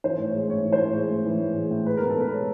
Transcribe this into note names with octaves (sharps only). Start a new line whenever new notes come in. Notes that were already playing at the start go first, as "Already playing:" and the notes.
E3 C5
A2
C#5
G#3
A2 C#5
E3
C5
A2
G#3
A2
E3
A2
G#3
A2
G#3 B4
B2 A#4
A4
B2 B4
G#3 C#5